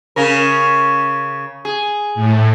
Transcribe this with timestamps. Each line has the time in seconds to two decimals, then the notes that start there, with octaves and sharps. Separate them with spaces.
0.16 C#3 C#4 A#4
1.65 G#4
2.15 A2